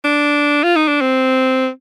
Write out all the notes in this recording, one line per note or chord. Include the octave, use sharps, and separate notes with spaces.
D4
F4
D#4
D4
C4